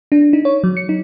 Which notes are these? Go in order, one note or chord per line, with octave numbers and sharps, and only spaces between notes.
D4
D#4
C#5
F#3
C#7
D#4